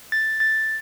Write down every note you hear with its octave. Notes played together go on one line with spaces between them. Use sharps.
A6
A6